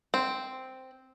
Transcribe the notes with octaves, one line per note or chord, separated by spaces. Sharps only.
C4